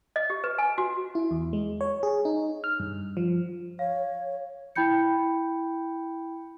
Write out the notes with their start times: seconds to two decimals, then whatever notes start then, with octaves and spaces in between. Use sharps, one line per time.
0.16 D#5
0.30 G4
0.44 B4
0.58 G#5
0.78 F#4
1.15 E4
1.31 E2
1.53 G#3
1.81 C#5
2.03 G#4
2.25 D#4
2.64 F6
2.79 G2
3.17 F3
3.79 C#5 F5
4.76 E4 G5 B5 G6 C#7